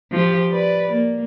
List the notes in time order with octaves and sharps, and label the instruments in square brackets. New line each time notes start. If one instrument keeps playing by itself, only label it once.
[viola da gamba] F3 G4
B4 D5
A#3